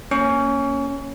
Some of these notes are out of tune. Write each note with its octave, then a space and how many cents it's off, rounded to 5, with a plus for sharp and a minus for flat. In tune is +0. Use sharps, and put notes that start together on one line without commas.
A#3 +0 C#4 +0 C#6 +30